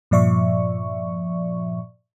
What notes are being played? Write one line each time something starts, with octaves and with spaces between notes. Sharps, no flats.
G2 A#2 F3 D5 E5 C#6